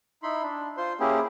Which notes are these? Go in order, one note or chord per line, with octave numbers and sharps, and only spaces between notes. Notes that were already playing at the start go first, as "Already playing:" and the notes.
D#4 E4 B5 C6
D4
F4 C5 C6
A#3 C#4 E4 G4 G#4